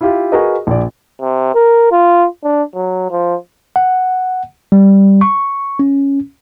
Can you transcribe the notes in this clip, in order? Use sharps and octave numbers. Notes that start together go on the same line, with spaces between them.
E4 F4 G4
F#4 G#4 A#4 B4 D#5
A#1 D5
C3
A#4
F4
D4
F#3
F3
F#5
G3
C#6
C#4